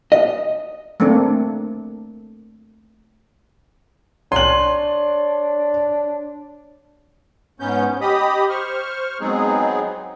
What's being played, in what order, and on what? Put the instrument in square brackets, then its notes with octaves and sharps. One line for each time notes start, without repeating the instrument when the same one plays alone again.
[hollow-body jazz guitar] D#5
[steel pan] A3 A#3 C4 D4
[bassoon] D4 [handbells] C#5 [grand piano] C6 F#7
[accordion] G#2 B3 C#4 G6
G4 D#5 B5 D#6
C5 C#6 F6
F#3 G#3 B3 C4 D#4 G#4